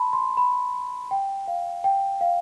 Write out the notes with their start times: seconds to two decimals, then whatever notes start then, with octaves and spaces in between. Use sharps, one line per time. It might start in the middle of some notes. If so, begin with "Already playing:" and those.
Already playing: A5 B5 C6
0.13 C6
0.37 B5
1.11 G5
1.48 F5
1.84 G5
2.21 F5